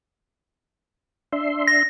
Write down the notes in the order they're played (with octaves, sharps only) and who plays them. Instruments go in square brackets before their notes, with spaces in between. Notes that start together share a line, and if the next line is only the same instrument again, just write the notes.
[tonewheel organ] D4 E5 C6
[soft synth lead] A#6